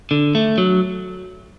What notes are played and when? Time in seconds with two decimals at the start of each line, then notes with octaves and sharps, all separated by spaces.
0.11 D3
0.35 A3
0.58 F#3